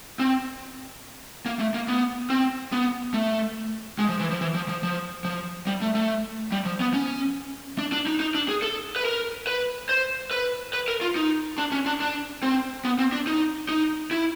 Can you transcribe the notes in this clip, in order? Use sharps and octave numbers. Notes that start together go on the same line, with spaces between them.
C4
A#3
A3
A#3
B3
C4
B3
A3
G#3
F3
E3
F3
E3
F3
F3
F3
F3
G3
A3
A3
G3
F3
B3
C#4
D4
D4
D#4
D#4
D4
G#4
A4
B4
A#4
B4
C5
B4
B4
A#4
F4
D#4
D4
C#4
D4
D4
C4
B3
C4
D4
D#4
D#4
E4